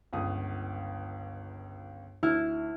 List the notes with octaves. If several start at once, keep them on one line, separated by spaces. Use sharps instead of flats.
G1 C#2 D#6
D2 E4 F6